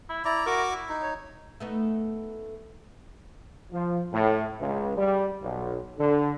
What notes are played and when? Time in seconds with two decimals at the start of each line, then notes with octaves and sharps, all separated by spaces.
0.09 E4
0.25 E4 D5 A#5
0.46 F#4 A#4 C#6 D6
0.71 E4
0.89 D#4
1.02 C#5
1.60 A3 B3 D#4
3.73 F3
4.13 A2
4.60 C#2
4.97 G3
5.43 B1
5.99 D3